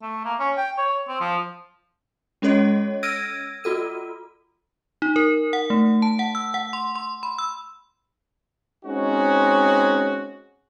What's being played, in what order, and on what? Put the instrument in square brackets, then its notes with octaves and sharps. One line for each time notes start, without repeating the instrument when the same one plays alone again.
[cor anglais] A3
A#3
C#4
G5
C#5
C4
F3
[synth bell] G#3 C#4 A4 C#5 D#5
E6 F6 G#6 A#6 D7 D#7
F4 F#4 A4 D#7
D#4
A#4
F#5
A3
A5
F#5
E6
F#5
C6
C6
B5
E6
[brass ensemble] G#3 C4 C#4 D#4 F#4